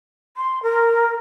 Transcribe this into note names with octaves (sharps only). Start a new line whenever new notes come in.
C6
A#4